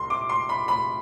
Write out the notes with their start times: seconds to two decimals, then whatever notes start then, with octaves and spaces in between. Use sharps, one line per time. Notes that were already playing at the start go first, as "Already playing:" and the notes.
Already playing: C2 C6
0.10 D6
0.29 C6
0.49 B5
0.68 B5